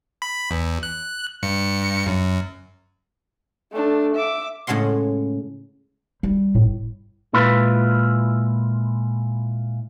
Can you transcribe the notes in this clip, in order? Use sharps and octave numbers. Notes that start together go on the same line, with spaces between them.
B5
E2
F#6
G2 C#7
F#2
A3 D4
E5 D6
A2 C#3 G#3 F#5 C6
G3
G1 A2
A#2 G#3 E4 F4 B4